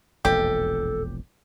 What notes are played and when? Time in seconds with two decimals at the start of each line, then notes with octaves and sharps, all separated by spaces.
0.25 E1 A#1 F2 G4 A4